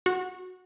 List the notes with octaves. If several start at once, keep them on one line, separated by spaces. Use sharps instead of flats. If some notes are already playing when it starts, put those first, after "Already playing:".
F#4